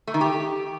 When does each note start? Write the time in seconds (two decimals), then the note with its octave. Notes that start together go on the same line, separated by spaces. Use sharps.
0.07 A3
0.14 D#3
0.21 G4